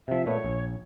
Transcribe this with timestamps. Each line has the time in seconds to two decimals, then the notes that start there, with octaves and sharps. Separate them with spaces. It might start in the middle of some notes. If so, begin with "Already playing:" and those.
0.08 C3 F3 E5
0.26 A#2 A3 B3 C#5
0.44 A#1